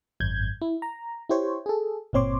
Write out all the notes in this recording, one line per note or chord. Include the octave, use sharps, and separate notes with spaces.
G#1 F#2 G6 G#6
E4
A#5
E4 G4 C5 C#5
G#4 A4
G1 A#2 C4 C#5 C6 D6